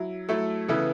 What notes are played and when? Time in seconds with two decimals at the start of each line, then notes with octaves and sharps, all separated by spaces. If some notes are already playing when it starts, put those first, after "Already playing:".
Already playing: F#3 E4
0.29 F#3 A3 E4 A4
0.68 C#3 E3 B3 E4 A4